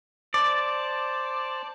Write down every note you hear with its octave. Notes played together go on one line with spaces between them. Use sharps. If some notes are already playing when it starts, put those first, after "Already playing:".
C5 D5 A5